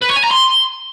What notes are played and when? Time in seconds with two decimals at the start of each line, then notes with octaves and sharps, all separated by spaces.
0.02 B4
0.09 C#5
0.16 G#5
0.24 A#5
0.31 C6